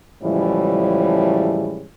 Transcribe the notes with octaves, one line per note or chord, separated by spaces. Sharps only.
A2 C#3 E3 F3 G3 G#3